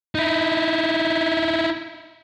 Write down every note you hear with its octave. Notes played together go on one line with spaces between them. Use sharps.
D#4 E4